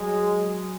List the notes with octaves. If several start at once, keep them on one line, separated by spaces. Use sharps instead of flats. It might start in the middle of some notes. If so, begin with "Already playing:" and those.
Already playing: F#3 G#3